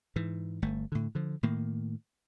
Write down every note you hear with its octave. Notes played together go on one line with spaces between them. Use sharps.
G#2 E3
G1 A3
A2 D3
D3 F3
A2 D#3 A#3